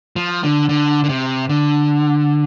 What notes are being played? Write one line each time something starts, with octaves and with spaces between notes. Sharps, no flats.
F3
D3
D3
D3
C3
D3